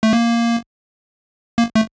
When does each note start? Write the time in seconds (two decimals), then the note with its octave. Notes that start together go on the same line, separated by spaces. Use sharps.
0.03 A3
0.13 A#3
1.58 A#3
1.75 A3